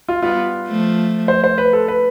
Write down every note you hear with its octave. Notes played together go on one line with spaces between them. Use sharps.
F4
G3 B3 F4
F3 A3
C5
C5
B4
A4
B4